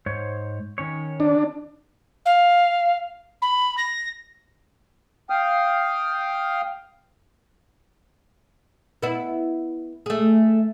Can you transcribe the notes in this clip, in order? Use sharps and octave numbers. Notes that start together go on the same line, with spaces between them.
G#2 C5 C#5
D#3 C#4 C#5
D4
F5
B5
A#6
F5 G5 D#6 F6
B3 E4
A3 G#4